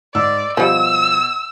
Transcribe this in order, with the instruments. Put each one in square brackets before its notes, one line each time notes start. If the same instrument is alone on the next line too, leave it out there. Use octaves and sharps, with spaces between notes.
[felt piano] G#2 E6 [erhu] D5
[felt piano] B2 [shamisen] F3 G3 [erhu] E6